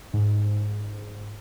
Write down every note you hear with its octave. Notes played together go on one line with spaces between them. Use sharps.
G#2